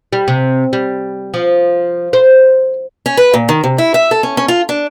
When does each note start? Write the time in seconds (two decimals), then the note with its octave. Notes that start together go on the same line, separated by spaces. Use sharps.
0.13 G3
0.28 C3
0.73 G3
1.34 F3
2.13 C5
3.06 C#4
3.17 B4
3.34 A#2
3.49 D#3
3.64 C3
3.78 E4
3.94 E5
4.11 A4
4.23 C#4
4.37 C#4
4.48 F4
4.69 D4